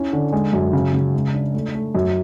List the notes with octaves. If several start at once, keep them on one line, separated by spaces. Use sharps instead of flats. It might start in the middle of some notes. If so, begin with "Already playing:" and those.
Already playing: C#4 E4
D3
G#3
F#2
C#3
C#3
G#3
D4
A3
A3
F#2